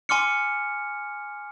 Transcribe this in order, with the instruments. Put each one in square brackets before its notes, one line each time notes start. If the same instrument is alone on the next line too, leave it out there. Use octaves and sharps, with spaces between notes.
[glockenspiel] G#5 C6 D6 F6 C#7